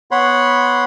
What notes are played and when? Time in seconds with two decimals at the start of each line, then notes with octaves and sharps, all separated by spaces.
0.11 B3 C#5 F#5 B5 C6